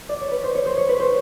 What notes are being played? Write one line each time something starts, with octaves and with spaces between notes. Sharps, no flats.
D5
C#5
B4
C5
C#5
C5
C#5
B4
C5